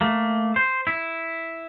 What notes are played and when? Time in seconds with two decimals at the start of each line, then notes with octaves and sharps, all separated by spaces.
0.01 A3 A#3
0.56 C5
0.87 E4